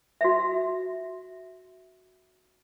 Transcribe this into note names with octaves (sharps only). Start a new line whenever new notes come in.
F#4 E5